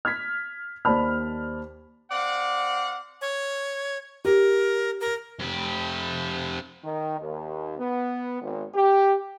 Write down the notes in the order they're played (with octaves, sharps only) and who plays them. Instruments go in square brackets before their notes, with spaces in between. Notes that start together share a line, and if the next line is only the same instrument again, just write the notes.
[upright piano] F6 G#6 B6
D#2 C5 D5 A5 B5 F6
[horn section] C4 D5 F5 F#5
[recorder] C#5
[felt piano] G4 [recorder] A#4
[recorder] A#4
[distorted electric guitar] F2 G4
[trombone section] D#3
D#2
B3
G#1
G4